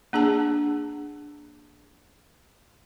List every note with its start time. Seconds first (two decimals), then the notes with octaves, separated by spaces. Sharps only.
0.13 A#3 D4 G#4 A5